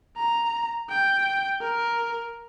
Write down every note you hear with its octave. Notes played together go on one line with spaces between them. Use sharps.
A#5
G5
A#4